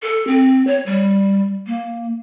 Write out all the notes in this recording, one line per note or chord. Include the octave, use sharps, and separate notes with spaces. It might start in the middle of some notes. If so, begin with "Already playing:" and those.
A4
C4
C#5
G3
A#3